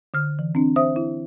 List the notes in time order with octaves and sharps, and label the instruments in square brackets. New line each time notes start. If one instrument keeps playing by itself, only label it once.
[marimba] D3 F6
E3
C4 D4
C5 E5 D#6
E4